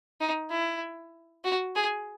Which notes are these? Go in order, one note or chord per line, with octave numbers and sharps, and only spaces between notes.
D#4
E4
F#4
G#4